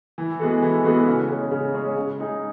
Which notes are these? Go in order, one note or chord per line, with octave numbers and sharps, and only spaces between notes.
E3
G#3 B3 F#4 A4
E3
G#3 B3 F#4 A4
C#3
G#3 C#4 G#4
C#3
G#3 C#4 G#4
C#3
G#3 D#4 G#4